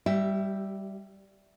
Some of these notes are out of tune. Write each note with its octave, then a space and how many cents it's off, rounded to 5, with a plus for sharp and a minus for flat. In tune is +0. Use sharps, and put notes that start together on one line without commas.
G3 +0 G4 -40 E5 +0